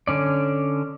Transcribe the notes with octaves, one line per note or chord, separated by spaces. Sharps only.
D3 C#4 D5